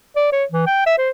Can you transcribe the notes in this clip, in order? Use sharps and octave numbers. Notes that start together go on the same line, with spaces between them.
D5
C#5
E3
G5
E5
C5